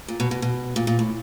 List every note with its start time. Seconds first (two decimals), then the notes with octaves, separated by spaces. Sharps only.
0.08 A#2
0.20 B2
0.31 B2
0.42 B2
0.76 A#2
0.87 A#2
0.99 A2